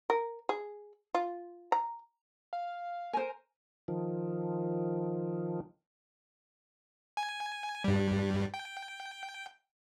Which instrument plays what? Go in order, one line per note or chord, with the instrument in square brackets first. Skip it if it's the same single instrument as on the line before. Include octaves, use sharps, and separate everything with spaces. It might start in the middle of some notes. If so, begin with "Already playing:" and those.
[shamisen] A#4
G#4
F4
A#5
[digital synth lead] F5
[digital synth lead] A#4 [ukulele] C5 G#5
[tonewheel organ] D#3 F3
[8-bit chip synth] G#5
G2 G3
G5